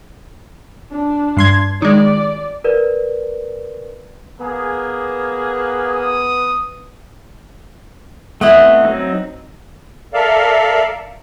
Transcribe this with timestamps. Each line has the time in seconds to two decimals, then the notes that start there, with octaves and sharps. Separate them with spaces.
0.91 D4
1.37 G2 C6 G#6
1.82 D#3 G#3 D5
2.64 A#4 B4 D5
4.40 A#3 B3 G#4
5.92 D#6
8.41 A3 B3 C4 E4 D#5 F#5
8.84 F#3 C4 D#4
10.14 A4 A#4 D5 E5 F5